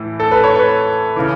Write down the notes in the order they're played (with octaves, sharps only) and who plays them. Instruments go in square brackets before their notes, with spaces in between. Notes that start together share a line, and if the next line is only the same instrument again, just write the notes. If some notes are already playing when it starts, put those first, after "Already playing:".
Already playing: [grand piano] A2 E3
A4
B4
C#5
B4
C#3 E3